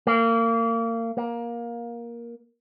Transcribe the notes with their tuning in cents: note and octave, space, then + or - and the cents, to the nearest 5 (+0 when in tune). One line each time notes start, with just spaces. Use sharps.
A#3 -30
A#3 +15